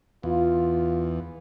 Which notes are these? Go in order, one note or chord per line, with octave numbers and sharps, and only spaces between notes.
E2 F4